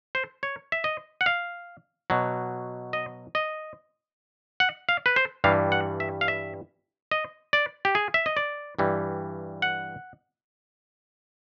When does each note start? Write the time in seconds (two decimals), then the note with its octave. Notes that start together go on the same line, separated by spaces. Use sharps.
0.15 C5
0.43 C#5
0.72 E5
0.84 D#5
1.21 F#5
1.26 F5
2.10 B2 F#3
2.93 D#5
3.35 D#5
4.60 F#5
4.89 F5
5.06 B4
5.16 C5
5.44 G2 E3 G3 F5
5.72 F#5
6.00 E5
6.21 F5
6.28 E5
7.11 D#5
7.53 D5
7.85 G4
7.95 G#4
8.14 E5
8.26 D#5
8.37 D5
8.79 G2 E3 G3
9.62 F#5